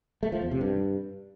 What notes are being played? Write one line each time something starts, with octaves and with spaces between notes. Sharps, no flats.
A3
F3
E2
C3
G2